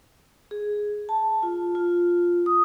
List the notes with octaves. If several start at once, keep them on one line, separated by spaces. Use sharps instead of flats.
G#4
A5
F4
F4
D#6